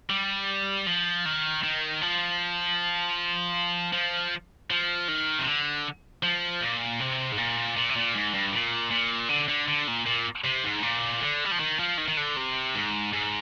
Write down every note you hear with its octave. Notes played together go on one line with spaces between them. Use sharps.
G3
F3
D#3
D#3
F3
F3
F3
D#3
C3
D3
F3
A#2
C3
G#2
A#2
A#2
C3
A#2
G#2
G2
A#2
A#2
D3
D3
D3
A#2
A#2
C3
G#2
A#2
D3
G3
F3
D#3
F3
D#3
D#3
D3
C3
G#2
G#2